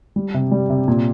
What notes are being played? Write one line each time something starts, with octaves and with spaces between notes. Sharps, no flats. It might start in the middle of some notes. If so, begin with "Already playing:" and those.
G3
C3
G3
C3
A#2